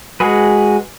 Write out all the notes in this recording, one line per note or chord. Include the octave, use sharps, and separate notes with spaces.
G#3 F#4 G#4 B4